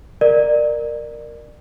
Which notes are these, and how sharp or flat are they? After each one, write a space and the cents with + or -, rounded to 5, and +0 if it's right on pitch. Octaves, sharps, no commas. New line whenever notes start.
A#4 +0 D5 +25